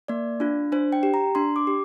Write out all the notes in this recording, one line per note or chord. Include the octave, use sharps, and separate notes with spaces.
A#3 D5
D4 F4
D4 C5
G5
G4
A#5
D4 C6
D6
G4